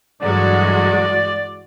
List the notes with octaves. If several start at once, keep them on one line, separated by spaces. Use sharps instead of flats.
G2 D3 E3 F#3 G#3 F#4 D5